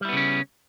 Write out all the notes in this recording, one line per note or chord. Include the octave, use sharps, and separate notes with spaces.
C#3 G3 B3 C#4 E4